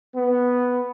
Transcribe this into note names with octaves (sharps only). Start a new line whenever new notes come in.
B3